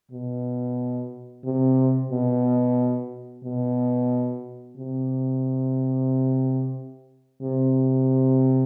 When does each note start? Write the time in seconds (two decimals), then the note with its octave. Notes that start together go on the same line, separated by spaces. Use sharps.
0.12 B2
1.45 C3
2.11 B2
3.44 B2
4.77 C3
7.42 C3